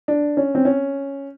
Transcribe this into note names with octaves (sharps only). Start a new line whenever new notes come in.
D4
C#4
C4
C#4